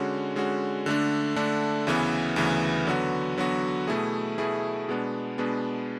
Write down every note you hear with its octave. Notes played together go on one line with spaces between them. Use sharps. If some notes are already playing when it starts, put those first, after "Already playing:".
Already playing: D3 G#3 C#4 F#4
D3 G#3 C#4 F#4
D3 A3 D4
D3 A3 D4
D2 C#3 E3 B3
D2 C#3 E3 B3
D3 F#3 B3 F#4
D3 F#3 B3 F#4
B2 A3 E4 G#4
B2 A3 E4 G#4
B2 G#3 B3 D4
B2 G#3 B3 D4